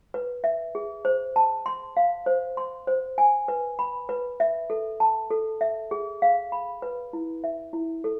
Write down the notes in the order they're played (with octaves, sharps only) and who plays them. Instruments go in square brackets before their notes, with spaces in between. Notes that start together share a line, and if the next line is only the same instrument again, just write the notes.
[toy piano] B4
E5
G#4
C5
A5
C6
F5
C5
C6
C5
G#5
B4
B5
B4
E5
A4
A5
A4
E5
G#4
F5
B5
B4
E4
E5
E4
A4